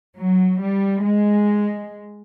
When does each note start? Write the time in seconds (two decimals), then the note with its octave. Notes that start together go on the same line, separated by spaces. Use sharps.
0.16 F#3
0.60 G3
1.02 G#3